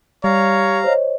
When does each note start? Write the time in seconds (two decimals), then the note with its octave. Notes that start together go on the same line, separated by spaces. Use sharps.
0.24 G3 C#5 F5 A#5
0.84 C5 C#5 D#5